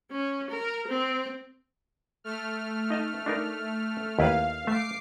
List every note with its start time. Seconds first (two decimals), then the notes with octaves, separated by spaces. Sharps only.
0.11 C#4
0.50 A#4
0.87 C4
2.24 A3 F6
2.90 D#4 D#5 A5
3.26 D4 D#4 A#4
4.19 D#2 E4 B4 F5
4.67 A3 E5 D6 C7